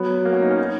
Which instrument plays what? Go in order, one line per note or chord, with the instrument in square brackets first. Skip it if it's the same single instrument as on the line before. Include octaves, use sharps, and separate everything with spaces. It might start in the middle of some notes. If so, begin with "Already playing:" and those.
Already playing: [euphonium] F#3 [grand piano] B3
[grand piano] A#3
C#4
D#4
C#4
D#4